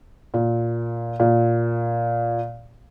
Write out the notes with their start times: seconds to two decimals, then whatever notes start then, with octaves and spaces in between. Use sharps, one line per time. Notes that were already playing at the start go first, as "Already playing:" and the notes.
0.34 A#2
1.20 A#2